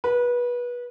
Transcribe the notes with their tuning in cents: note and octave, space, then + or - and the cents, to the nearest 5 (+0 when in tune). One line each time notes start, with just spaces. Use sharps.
B4 -25